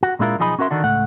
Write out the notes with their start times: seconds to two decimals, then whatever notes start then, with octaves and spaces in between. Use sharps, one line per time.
0.03 F#4
0.19 A#2 G#3 D4 E4 F4 A#4
0.39 B1 F3 D#4 G#4 D#5 B5
0.59 C#4 F#4 A#4 E5 C6
0.70 D3 D#3 D4 F#4
0.84 C#2 A2 A3 F#5